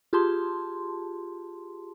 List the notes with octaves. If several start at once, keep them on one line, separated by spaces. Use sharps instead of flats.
F4 G4 G#4 A5 C6